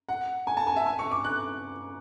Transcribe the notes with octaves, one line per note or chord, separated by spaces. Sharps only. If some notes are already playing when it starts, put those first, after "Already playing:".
F#5
G#5
A5
G#5
E5
G#5
C#6
D6
F#6